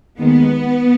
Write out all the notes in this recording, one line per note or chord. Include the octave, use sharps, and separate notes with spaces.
D#2 D#3 G#3 B3